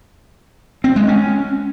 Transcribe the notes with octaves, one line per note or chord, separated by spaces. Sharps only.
C4
G#3
C#4